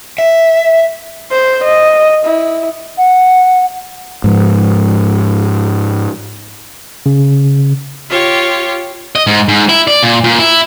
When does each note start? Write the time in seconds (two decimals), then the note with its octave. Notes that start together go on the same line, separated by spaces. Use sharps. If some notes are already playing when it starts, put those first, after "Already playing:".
0.18 E5
1.31 C5
1.64 D#5
2.26 E4
2.98 F#5
4.24 G#2 F3
7.06 C#3
8.09 F4 G4 C#5
9.16 D#5
9.27 G#2
9.48 G#2
9.69 E4
9.88 D5
10.03 A#2
10.24 A#2
10.39 E4